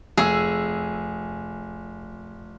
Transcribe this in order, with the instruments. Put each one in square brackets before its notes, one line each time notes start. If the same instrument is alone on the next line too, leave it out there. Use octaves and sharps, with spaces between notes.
[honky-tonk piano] F1 E6 [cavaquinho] G#4